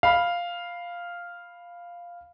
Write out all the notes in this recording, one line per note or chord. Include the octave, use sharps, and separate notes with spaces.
F5 B5